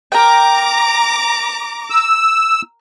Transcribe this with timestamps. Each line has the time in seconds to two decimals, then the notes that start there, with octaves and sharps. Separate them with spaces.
0.12 A#4 G5 A#5 D6
1.90 E6